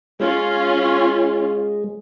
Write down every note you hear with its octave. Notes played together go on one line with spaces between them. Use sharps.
G#3 C#4 F4